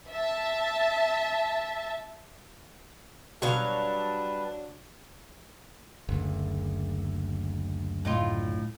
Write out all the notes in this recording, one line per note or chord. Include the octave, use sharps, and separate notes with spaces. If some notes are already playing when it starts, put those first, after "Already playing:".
E5 A5
B2 F#3 G3 D4 B4 C#5 F5 A5
F#1 D2
A2 D#4 F4